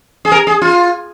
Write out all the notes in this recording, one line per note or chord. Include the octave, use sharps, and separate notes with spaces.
G#4
A#4
G#4
F4